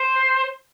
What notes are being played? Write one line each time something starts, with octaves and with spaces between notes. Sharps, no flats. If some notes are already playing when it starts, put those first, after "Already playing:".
Already playing: C5